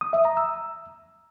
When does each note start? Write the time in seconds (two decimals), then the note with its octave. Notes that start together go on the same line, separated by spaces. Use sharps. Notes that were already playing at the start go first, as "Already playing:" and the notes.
0.01 D#6
0.13 E5
0.25 A#5
0.37 E6